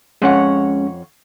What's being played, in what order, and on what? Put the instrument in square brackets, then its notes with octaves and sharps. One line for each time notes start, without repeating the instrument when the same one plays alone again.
[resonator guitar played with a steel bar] F2 C#5 F#5 [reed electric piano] G#3 C#4